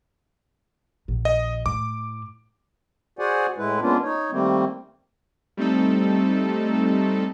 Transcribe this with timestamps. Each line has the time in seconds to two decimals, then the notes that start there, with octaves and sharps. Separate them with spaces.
1.08 A#1
1.25 D#5
1.66 A2 D6
3.19 F#4 G#4 C5 D5 F#5 G#5
3.58 A2 G#3 E4 B4
3.81 G#3 A#3 B3 C#4 D4 F4
4.03 D#4 C#5
4.32 D#3 G3 A3 A#3 C4
5.57 G3 A3 C4 D#4 A4